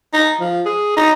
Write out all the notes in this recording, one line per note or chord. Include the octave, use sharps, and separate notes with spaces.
D#4
F3
G#4
D#4